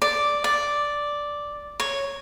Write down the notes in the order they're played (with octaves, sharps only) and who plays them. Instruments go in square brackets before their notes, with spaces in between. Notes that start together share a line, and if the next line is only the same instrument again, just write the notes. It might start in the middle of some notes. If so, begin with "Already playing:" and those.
[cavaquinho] D5
D5
C#5